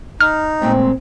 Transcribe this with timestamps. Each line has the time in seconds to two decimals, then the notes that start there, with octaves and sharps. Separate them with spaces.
0.21 D#4 F6
0.62 A#2 G#3 A3 C4